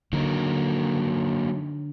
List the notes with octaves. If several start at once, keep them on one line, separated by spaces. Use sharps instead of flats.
D3 F#3 A#3 D#4